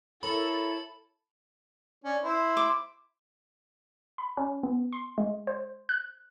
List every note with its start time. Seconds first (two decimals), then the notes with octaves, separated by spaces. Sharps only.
0.23 E4 A4 A#4 C#5 B5
2.04 C#4 D4
2.23 E4 C5
2.57 D6
4.18 B5
4.37 C#4
4.63 B3
4.93 C6
5.18 G#3
5.47 C5
5.89 F#6